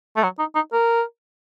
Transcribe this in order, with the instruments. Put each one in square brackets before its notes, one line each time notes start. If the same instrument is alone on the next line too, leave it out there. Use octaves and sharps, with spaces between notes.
[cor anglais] A3
F#3
D#4
D#4
A#4